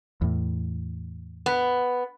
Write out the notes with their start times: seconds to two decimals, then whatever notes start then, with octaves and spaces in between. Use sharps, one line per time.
0.21 E2 A2
1.46 B3